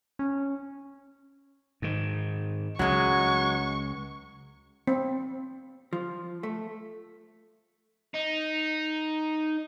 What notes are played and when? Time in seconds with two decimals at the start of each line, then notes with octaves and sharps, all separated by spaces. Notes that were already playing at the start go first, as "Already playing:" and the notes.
0.19 C#4
1.82 G#2 D#3
2.79 C#2 F#3 G#3 C#6
4.87 C4
5.93 F3
6.43 A3
8.14 D#4